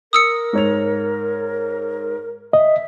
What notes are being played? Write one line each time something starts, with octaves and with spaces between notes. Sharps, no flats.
A#4 D#6 E6 C#7
G#2 C#5 F7
D#5 E5